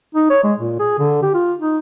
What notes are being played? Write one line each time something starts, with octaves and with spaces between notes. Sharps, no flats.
D#4
C#5
G#3
A#2
G#4
D3
G4
F4
D#4